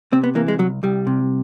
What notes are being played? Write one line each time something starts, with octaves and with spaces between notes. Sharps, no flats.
C3 C4
B3
E3 A#3
G#3
C2 F#3
C2 G3
C3